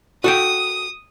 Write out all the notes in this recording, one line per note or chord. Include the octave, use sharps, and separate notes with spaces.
F#4 A4 G5 D#6